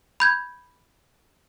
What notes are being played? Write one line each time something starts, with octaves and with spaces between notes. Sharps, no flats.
B5 G6 G#6